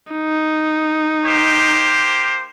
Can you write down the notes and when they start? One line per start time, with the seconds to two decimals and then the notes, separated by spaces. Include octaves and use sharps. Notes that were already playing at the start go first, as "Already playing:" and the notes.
0.13 D#4
1.24 A#3 G4 C5